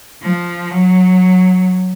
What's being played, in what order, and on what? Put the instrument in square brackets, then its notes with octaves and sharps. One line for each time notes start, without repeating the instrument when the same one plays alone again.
[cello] F3
F#3